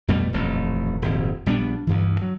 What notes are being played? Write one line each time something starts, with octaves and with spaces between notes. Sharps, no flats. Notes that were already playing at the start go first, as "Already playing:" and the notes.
F2 B2 G3 A3
D#1 A1 F2 A3
D#1 G#1 F2
A#1 G3 B3 D4
D2 G2 E3
F#3